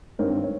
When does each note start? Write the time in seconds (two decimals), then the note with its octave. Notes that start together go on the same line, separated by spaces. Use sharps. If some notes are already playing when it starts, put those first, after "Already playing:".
0.18 G#1 G2 G3 C4 A#4 C#5
0.44 C#5